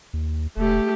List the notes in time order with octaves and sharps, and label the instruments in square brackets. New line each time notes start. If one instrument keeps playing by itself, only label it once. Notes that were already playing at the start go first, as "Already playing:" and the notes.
[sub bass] D#2
[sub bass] E1 [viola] A3 G4